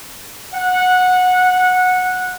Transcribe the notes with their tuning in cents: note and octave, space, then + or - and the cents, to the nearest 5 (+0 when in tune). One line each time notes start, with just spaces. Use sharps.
F#5 -15